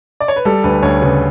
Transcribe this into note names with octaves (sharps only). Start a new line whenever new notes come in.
D5
C#5
B4
G3 A4
D2 B4
D2 C#5
C#3 B4